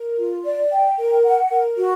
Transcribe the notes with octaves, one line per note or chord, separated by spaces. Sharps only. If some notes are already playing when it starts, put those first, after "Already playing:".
Already playing: A#4
F4
D5
G5
A#4
F#5
A#4
F#4